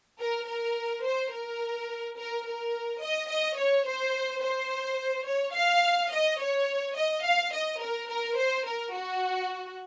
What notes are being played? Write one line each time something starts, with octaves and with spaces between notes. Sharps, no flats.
A#4
A#4
C5
A#4
A#4
A#4
D#5
D#5
C#5
C5
C5
C#5
F5
D#5
C#5
D#5
F5
D#5
A#4
A#4
C5
A#4
F#4